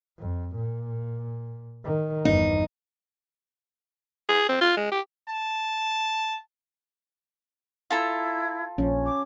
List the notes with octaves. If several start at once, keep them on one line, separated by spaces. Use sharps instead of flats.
F2
A#2
D#3
G1 E2 D#4
G#4
C4
F4
G#3
G4
A5
E4 F4 A4 A#5
A#1 F3 C#4
D6